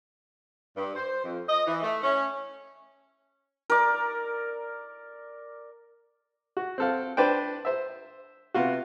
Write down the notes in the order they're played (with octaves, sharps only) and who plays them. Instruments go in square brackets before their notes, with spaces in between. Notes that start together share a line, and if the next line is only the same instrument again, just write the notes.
[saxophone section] G2
C5
F2
D#5
E3
A3
C#4
[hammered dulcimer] A#4 D5
[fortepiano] F#4
C4 A4 F5
D4 B4 C5 D5 G5
C5 E5
C3 B3 F4 F#4